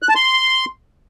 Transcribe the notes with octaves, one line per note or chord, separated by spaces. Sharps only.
F#6
A5
C6